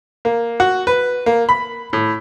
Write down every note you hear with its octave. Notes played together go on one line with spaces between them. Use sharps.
A#3
F#4
B4
A#3
B5
A2